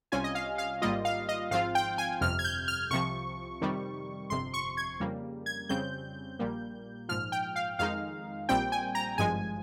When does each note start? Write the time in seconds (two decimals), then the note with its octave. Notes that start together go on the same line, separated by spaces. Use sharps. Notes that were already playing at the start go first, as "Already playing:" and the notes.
0.12 C2 C3 G3 C#4 F4 G#5
0.24 D#5
0.35 F5
0.58 F5
0.82 G#1 G#2 G3 A#3 F4 D#5
1.05 F5
1.29 D#5
1.51 G#1 G#2 F3 C4 F4 F5
1.75 G5
1.98 G#5
2.21 G1 F2 C3 F6
2.39 G#6
2.44 G6
2.68 F6
2.91 C2 C3 F3 C#6
3.61 F2 C3 D#3 G3
4.30 G1 F2 C3 C6
4.54 C#6
4.77 G#6
5.00 F2 C#3 G3 A#3
5.46 G#6
5.69 F2 C#3 G3 C4 G6
6.39 A#1 A#2 G3 A#3
7.09 A#1 G#2 F3 F6
7.32 G5
7.56 F5
7.79 F2 D#3 G#3 D#4 F5
8.49 A#1 A#2 G3 C4 G5
8.72 G#5
8.95 A#5
9.18 G#1 G2 F3 G#3 G#5